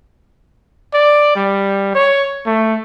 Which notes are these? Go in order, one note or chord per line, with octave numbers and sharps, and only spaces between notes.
D5
G3
C#5
A3